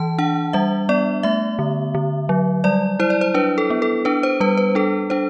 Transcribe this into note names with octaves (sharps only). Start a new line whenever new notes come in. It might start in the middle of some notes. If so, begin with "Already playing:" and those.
Already playing: E3 A5
D4 F#5
G3 E5
B3 D5
A3 E5
D3
D3
F#3
G3 D5
E4 C5
D5
C5
D4 B4
A4
B3
A4
D4 B4
C5
G3 B4
B4
D4 A4
D4 C5